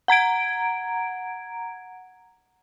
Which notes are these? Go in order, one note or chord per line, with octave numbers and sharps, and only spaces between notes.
F#5 A#5 G#6 D7